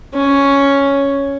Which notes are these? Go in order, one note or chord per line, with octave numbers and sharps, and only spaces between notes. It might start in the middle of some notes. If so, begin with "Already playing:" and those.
C#4